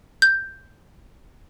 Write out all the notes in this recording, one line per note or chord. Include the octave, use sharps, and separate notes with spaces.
G6